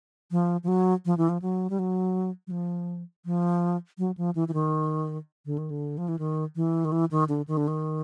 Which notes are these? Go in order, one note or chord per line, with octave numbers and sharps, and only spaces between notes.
F3
F3
F#3
F3
E3
F3
F#3
G3
F#3
F#3
F3
F3
F#3
F3
E3
E3
D#3
D3
D#3
D3
F3
E3
D#3
E3
D#3
E3
D#3
D3
D#3
D3
D#3